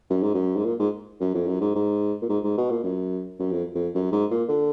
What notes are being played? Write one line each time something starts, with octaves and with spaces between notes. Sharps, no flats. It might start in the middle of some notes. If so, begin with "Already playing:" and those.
F#2
G#2
F#2
G#2
A#2
G#2
F#2
F2
F#2
G#2
G#2
A#2
G#2
G#2
B2
A#2
F#2
F#2
F2
F2
F#2
G#2
A#2
D3